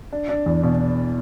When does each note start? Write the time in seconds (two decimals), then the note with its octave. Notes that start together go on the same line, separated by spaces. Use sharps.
0.13 D4
0.29 D4
0.46 E2
0.63 B2